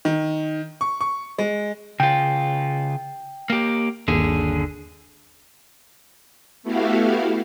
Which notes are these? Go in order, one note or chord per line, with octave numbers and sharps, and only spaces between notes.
D#3
C#6
C#6
G#3
C#3 F4 G5
A#3 G4
G1 D#2 D3 G#4
A3 B3 E4 F#4 G4 F5